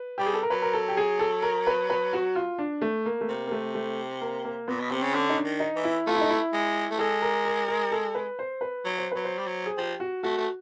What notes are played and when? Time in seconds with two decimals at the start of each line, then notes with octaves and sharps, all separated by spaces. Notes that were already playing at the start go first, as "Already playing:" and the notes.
Already playing: B4
0.18 G3 G4
0.26 G#4
0.33 A4
0.43 A#4
0.50 F#3 B4
0.62 A#4
0.73 A4
0.88 G4
0.97 G#4
1.19 A4
1.43 A#4
1.67 B4
1.90 B4
2.13 F#4
2.35 F4
2.59 D4
2.82 A3
3.06 A#3
3.21 A3
3.29 C3 A#3
3.47 A#3
3.52 A3
3.75 A3
4.21 A#3
4.45 A#3
4.68 A#2 B3
4.80 B2
4.91 C3 C4
5.02 C#3
5.14 D3 C#4
5.30 D#4
5.36 D4
5.45 D#3
5.60 D#4
5.76 E3
5.84 E4
6.07 A3 F4
6.15 E4
6.21 D#4
6.30 E4
6.53 G#3
6.90 A3
6.99 G#3 A4
7.22 A#4
7.45 A#4
7.68 A#4
7.92 A4
8.15 B4
8.39 C5
8.61 B4
8.85 F#3
8.98 C5
9.12 F#3 B4
9.25 C5
9.38 G3
9.46 F#3
9.66 G#4
9.77 F3 G4
10.00 F#4
10.23 A3 F#4
10.38 A3